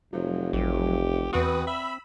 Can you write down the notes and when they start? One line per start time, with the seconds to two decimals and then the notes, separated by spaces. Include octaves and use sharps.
0.13 F1 F3 F#3
0.53 A1 G4
1.33 E2 C4 F#4 B4 D#6
1.67 E5 B5 E6